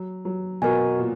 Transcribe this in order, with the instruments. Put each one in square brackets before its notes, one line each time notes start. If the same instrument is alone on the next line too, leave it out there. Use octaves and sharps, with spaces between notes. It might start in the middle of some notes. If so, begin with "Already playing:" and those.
Already playing: [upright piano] F#3
F#3
[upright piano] B2 [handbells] F#4 A#4 D#5 G#5
[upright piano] A#2